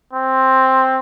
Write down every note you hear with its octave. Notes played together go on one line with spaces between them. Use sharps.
C4